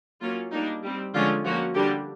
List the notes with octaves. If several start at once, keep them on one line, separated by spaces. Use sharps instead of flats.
F#3 A#3 C#4 F4
G3 A#3 D4 D#4
G3 C4
D3 F3 G#3 C#4 F4
F3 A#3 C#4 F#4
D3 G3 A#3 D4 G4